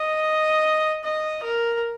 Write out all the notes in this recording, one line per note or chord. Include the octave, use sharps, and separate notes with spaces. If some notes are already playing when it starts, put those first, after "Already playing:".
Already playing: D#5
D#5
A#4